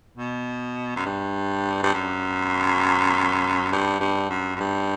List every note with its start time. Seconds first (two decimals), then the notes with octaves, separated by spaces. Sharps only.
0.17 B2
0.96 F#2
1.06 G2
1.83 G2
1.94 F#2
3.72 G2
4.01 G2
4.30 F#2
4.56 F#2
4.60 G2